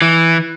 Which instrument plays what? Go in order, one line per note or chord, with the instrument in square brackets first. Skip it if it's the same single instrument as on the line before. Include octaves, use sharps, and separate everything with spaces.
[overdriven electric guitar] E3